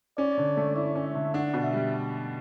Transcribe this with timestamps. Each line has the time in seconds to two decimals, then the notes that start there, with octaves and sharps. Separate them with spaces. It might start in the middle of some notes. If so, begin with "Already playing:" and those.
0.17 C#4 D5
0.38 D3
0.57 A3
0.76 E4 D5
0.96 C#4
1.05 E5
1.15 D3
1.34 D4 F#5
1.54 B2
1.64 E5
1.73 G3